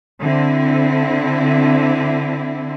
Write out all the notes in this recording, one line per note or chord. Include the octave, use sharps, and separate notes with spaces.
D3 C4 E4